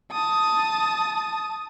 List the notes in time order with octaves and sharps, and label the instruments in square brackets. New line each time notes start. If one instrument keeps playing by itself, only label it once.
[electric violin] A5 D#6